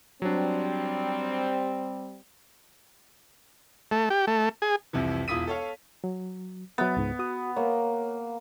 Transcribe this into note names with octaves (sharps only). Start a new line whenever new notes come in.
F#3 G3 C4 D4
A3
G4
A3
G#4
C2 F2 C3 E3
E1 E4 F4 D#6 B6 D#7
A4 C#5 F5
F#3
F#3 B3 E5 A6
C#2 G#2
F#4 D#6
A#3 C#5